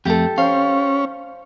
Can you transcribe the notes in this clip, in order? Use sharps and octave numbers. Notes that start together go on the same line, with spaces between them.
F2 A3 G4 A4
C#4 C5 F5